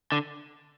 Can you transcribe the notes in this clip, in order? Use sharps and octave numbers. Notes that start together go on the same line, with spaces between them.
D3